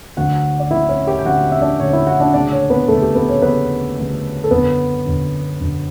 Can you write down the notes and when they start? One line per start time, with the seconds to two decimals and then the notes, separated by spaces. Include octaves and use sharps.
0.17 D2 D3 F#3 F#4 F#5
0.59 D5
0.71 D2 D3 F#3 E4 E5
0.89 C#4 C#5
1.07 G4 G5
1.19 G5
1.25 D2 D3 F#3 F#4 F#5
1.52 E5
1.61 D4 D5
1.79 D2 D3 F#3 C#4 C#5
1.93 E4 E5
2.07 F#4 F#5
2.20 D4 D5
2.34 D2 C#3 F#3 D4 D5
2.52 C#4 C#5
2.70 B3 B4
2.88 D2 C#3 F#3 A3 A4
3.02 G4
3.15 B3 B4
3.29 C#4 C#5
3.42 D2 C#3 F#3 B3 B4
3.96 D2 C#3 F#3
4.44 A4
4.51 F#2 D3 F#3 B3 B4
5.05 F#2 D3 F#3
5.60 F#2 D3 F#3